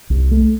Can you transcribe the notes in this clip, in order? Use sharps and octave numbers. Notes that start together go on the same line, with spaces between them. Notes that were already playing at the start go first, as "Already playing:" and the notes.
C2
A3